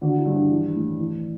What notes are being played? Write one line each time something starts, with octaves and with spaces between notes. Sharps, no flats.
D3 F#4
E4
G2
D4
E3
A2
E3